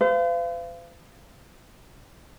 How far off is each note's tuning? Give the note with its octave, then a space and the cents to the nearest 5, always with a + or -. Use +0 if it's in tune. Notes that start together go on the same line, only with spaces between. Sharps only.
C5 -45 F5 -35